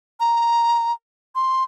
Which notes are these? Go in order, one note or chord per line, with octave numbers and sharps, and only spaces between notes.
A#5
C6